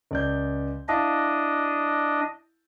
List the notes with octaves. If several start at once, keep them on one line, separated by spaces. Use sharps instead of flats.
C#2 D5 G6
D4 E4 D#5 F5 A5